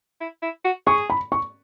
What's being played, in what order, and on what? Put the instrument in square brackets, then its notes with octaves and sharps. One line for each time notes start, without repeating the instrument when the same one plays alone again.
[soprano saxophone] E4
E4
F#4
[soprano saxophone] G#4 [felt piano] C#6
[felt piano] B5
C#6